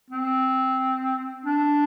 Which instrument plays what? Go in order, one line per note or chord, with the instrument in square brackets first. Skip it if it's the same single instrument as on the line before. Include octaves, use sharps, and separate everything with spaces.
[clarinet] C4
D4